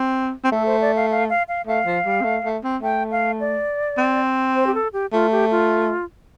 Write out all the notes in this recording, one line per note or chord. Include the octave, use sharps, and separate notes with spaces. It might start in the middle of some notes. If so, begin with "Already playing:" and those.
Already playing: C4
C4
A3 A4
C5
D5
F5
F5
F5
F5
A3 F5
F3
G3
C4
A3
A3
C4
A3 G5
F5
D5
C4
C5
G4
A4
G4
A3 F4
G4
F4